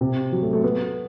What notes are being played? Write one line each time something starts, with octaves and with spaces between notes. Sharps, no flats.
C3
F#3
A3
A3
B3